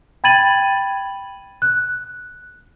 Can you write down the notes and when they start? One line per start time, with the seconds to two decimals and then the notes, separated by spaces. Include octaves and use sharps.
0.24 G5 B5 G#6 A6 D#7 F#7
1.62 F#6